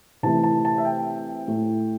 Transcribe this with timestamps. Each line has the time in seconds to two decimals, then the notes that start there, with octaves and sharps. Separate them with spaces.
0.23 C3 E3 A3 E4 A5
0.44 A5
0.65 A5
0.78 E5
0.85 G5
1.48 A2 A3 E4